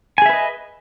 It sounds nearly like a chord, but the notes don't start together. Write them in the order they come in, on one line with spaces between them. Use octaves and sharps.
G#5 G#4 E5 B4 D#5